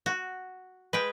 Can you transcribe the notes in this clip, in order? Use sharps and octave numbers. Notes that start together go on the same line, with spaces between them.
F#4
G#3 B4 G5